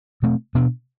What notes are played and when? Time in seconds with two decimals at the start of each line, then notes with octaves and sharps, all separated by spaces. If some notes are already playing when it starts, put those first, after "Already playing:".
0.23 B2 A3 C4
0.55 B2 B3 D4